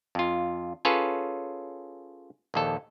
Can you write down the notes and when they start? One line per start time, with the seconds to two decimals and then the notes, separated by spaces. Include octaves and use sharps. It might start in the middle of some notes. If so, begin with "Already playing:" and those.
0.15 F2 F4
0.85 C#4 F4 G#4 A4 B4 C#5
2.54 A#1 D#2 A4